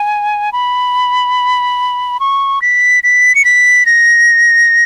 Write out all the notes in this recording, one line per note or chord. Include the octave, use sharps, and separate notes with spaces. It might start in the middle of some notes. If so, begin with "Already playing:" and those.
Already playing: G#5
B5
C#6
B6
B6
C#7
B6
A#6